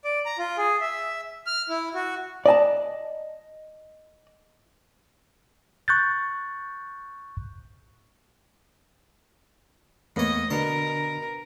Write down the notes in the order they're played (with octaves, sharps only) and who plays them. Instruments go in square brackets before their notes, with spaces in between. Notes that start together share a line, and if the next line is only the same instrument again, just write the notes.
[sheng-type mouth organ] D5
A#5
F4
G#4
E5
F6
E4
F#4
[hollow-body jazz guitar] D5 D#5 G#5 A5
[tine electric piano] C#6 F#6 G6 A6
[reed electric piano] E2 A#3 B3 [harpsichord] A2 C#5 [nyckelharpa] D#5
[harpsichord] B2 A5 [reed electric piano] D3 D4 [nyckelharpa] A#4